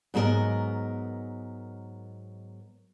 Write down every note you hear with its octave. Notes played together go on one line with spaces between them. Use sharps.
G#2 F#3 B3 F4 A#4 D#5